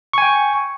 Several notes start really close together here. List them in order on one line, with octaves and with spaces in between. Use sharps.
C#6 G#5 G5